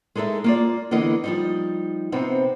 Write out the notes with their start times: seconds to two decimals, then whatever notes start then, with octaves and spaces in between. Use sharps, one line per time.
0.15 G#3 D#4 A4 A#4 E5
0.44 A#3 F4 D5
0.91 D3 E3 A#3 B3 D#5
1.24 F3 G3 D#4
2.12 C3 B3 C4 D#4